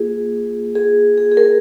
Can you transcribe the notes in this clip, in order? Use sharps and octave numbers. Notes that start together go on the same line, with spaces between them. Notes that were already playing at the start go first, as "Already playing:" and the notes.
Already playing: A#3 F4 G#4
G#4
G#4
G#4
A#4